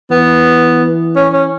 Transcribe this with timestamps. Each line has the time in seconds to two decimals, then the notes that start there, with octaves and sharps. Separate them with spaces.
0.11 E3 B3
1.16 C#4
1.33 C#4